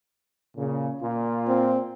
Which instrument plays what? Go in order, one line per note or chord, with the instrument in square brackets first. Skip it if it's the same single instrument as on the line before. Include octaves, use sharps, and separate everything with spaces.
[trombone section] A#2 C#3
A#2 F4
[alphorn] C4